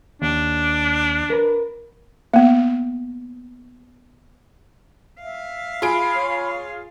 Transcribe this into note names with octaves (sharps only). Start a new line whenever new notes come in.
D#2 D4
A#4 B4
A#3 B3
E5 F5
F4 G#4 B5 D7
C#5